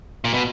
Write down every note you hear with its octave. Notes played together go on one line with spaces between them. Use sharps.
A#2
B2